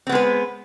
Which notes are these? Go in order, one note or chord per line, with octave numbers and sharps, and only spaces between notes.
G#3 B3 C4 B4